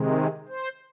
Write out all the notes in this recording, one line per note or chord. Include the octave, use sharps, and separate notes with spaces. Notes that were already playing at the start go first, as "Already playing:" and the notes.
Already playing: C3 D#3 G#3
C5